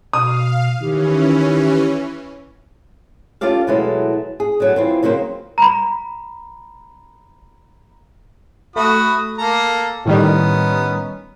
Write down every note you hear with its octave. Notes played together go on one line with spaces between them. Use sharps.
B2 F5 D#6
D#3 E3 C#4 G4
C#4 F4 G4 A4 D5 F5
B2 E3 F#3 G#3 A3
G#4
D3 F#3 B3
E3 C4 F4
C#3 F#3 A#3 C4 C5
A#5 B5
A3 F#4 B5 D#6
A#3 A4 A#5
A2 D#3 G3 B3 C#4 D#4